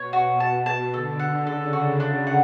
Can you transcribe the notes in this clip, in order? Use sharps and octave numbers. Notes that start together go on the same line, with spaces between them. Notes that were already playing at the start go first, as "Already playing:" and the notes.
Already playing: B2 C#5
F#4
A5
A5
D3 A4
F#5
C#3 A4
F#4
D4
F#5